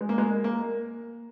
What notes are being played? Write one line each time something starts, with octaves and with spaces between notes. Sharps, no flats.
G#3
A#3
G#3
A#3